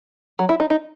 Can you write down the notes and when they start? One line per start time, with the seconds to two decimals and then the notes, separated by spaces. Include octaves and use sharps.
0.39 F#3
0.49 E4
0.60 D#4
0.70 D#4